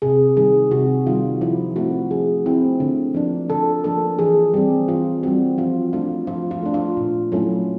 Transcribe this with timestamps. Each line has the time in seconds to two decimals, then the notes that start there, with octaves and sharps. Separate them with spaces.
0.02 C3 G#4
0.37 D#3 G3 G#4
0.71 C3 F#4
1.07 D#3 G3 F4
1.41 F3 E4
1.76 A3 C4 E4 F#4
2.11 F3 G#4
2.45 A3 C4 E4
2.80 D3
3.14 F3 A#3 D4
3.49 D3 A4
3.84 F3 A#3 D4 A4
4.19 E3 G#4
4.54 G3 C4 G4
4.88 E3 F4
5.23 G3 C4 F#4
5.58 F3 F4
5.93 A3 D4 F4
6.27 F3 F4
6.51 F4
6.63 A3 D4
6.74 F4
6.97 A#2
7.32 F#3 A3 C#4 E4